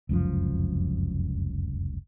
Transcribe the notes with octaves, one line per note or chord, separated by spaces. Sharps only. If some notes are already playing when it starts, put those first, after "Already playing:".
F1 C#2 F#2 F3